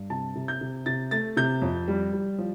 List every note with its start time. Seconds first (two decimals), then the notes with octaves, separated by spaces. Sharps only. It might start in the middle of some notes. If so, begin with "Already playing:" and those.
Already playing: G2
0.10 C3 A5
0.35 C3
0.48 G6
0.61 C3
0.86 C3 A6
1.11 A3 A6
1.37 C3 G6
1.62 F2
1.88 G3
2.13 G3
2.39 F3